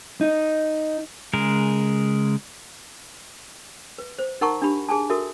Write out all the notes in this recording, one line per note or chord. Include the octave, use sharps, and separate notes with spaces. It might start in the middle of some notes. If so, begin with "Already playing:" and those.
D#4
C#3 G#3 A#4
B4
C5
D#4 A#4 F#5 A5 A#5 C#6
D4 G4 B5
G#4 G#5 A5
F#4 A4 A#4 E5